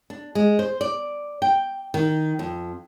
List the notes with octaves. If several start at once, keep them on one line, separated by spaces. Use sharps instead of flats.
D4
G#3
C5
D5
G5
D#3
F2